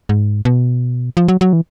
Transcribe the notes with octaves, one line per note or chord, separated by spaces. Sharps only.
G#2
B2
F3
F#3
F#3
E3